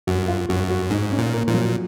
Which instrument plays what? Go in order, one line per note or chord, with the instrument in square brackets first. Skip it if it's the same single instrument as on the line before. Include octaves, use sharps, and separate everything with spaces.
[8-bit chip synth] F#2 [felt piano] F#4
[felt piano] F4
[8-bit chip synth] F#2 [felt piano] F#4
[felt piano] F#4
[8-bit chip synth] G#2 [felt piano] D#4
[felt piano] C#4
[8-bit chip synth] A#2
[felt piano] A#3
[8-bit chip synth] A#2 [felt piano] F3
[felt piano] F#3